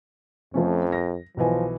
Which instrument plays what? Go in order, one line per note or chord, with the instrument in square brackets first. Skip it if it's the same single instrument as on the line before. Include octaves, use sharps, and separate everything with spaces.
[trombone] F2 [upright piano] F3 A3 C#4
[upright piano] A#6
[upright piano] B1 E3 G#5 [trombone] F3